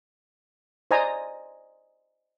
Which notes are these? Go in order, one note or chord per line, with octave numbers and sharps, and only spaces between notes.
C5 D5 D#5 G#5 A#5